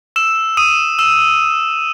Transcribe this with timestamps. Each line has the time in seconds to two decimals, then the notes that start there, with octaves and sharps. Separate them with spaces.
0.16 E6 E7
0.57 D#6 D#7
0.99 E6 E7